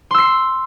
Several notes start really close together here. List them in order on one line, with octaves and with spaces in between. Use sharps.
C6 E6 C7